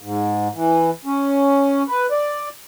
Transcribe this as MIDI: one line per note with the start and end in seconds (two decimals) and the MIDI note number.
0.01 0.48 44
0.54 0.90 52
1.05 1.82 61
1.88 2.06 71
2.11 2.49 74